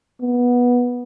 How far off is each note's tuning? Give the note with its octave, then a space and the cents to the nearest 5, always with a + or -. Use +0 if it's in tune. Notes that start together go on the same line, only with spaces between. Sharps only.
B3 -15